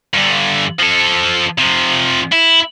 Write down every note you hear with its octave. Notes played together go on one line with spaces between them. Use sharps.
G2 D3
F3 A4
C3 F3
E4